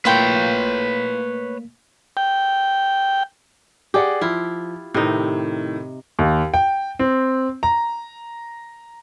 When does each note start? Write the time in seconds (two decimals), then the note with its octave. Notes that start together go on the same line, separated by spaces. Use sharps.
0.05 A3 A#3 E4 F4 B4 C#5 G5 B6
2.17 G5
3.94 G4 G#4 D5 F#5
4.21 F3 E4 F4
4.94 A2 C3 D#3 D#4
6.19 D#2
6.54 G5
6.99 C4
7.63 A#5